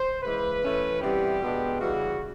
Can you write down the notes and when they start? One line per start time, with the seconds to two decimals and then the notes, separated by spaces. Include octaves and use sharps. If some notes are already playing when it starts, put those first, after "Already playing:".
Already playing: C5
0.23 C#3 E3 G#3 B4
0.63 E3 A3 C#4
1.02 C3 E3 G3 B3 G4
1.42 B2 G#3 B3 D4
1.80 C#3 E3 G3 F#4